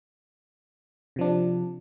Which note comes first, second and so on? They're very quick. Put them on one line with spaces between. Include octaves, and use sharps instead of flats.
C3 F3 D4